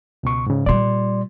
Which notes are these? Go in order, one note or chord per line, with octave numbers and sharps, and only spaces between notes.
C#2 B2 C#6
G#2 C#3
A#2 G3 D5 C6